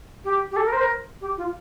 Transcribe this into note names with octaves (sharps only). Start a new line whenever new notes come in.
G4
G4
A4
A#4
C5
A#4
G4
F4